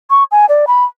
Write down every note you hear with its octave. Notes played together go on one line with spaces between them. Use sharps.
C#6
G#5
D5
B5